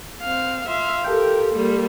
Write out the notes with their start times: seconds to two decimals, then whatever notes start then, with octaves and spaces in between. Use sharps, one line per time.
0.22 C4 F5
0.68 F4 E5 F5
1.04 G4 A4 A#4 G5
1.55 G3 A#3